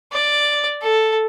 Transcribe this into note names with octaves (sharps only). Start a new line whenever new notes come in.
D5
A4